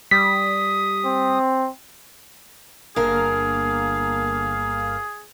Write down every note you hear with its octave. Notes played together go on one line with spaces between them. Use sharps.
G3 D#6 B6
C4
G1 D3 A#3 G#4 A#4 F5